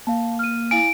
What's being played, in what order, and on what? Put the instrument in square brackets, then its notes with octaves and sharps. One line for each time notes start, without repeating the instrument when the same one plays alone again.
[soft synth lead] A#3 [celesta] F5 A5
[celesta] F6 D#7
[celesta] E4 F5 G#5 [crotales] D7